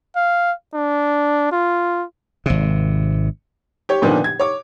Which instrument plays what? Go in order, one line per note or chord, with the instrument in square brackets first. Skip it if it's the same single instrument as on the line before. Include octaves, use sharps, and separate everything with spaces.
[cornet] F5
D4
F4
[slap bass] G#1 C3
[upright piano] G4 C#5
A#2 D3 D#3 F3 B3 D4
G#6
C#5 D6